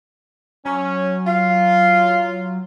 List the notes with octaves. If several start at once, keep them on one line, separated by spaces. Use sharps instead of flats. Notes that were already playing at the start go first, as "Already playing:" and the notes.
F#3 C#4
F4 F5